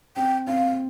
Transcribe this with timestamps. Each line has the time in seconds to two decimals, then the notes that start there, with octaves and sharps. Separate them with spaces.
0.16 C4 G5
0.47 C4 F5